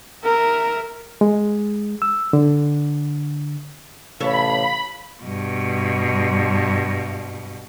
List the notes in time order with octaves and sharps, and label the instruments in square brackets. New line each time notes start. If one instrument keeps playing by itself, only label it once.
[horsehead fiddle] A#4 E5
[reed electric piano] G#3
E6
D3
[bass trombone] A1 [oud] C3 A4 C#5 [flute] F5 [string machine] B5
[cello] G2 B2